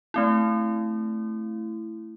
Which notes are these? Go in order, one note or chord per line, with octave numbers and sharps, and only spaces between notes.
A3 C4 E4